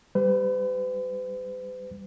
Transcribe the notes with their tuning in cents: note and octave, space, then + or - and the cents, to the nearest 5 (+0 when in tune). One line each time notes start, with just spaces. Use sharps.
G3 +0 B4 +45